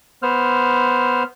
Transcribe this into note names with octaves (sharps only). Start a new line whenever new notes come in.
B3 C5 F6